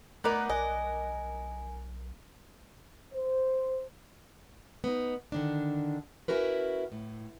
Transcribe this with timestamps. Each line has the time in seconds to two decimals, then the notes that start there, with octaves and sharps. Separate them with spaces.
0.24 A3 B3 D#4 A#4 D6 F#6
0.50 B1 D#5 G#5
3.12 C5
4.84 B3 D#4
5.32 D3 D#3 D4
6.28 C#4 E4 F#4 A#4 B4
6.92 A2